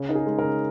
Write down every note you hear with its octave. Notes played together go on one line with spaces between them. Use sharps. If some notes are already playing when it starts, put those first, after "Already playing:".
Already playing: C#3
D#4 A#4
G#4
G#3
A#4
C#3